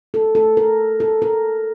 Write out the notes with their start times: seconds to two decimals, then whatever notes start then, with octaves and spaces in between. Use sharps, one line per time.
0.14 A4
0.35 A4
0.57 A#4
1.00 A4
1.22 A#4